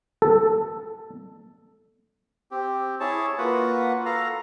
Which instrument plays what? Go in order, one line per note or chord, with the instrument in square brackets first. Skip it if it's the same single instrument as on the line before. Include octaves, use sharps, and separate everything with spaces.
[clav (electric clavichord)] A4
[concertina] C4 G4
E4 G#4 C#5 A5
A#3 F4 F#4 B4 F#5
A4 F5 A#5